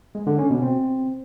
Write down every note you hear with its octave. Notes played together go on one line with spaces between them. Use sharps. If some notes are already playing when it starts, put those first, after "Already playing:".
G#3
D3
C#4
B2
C4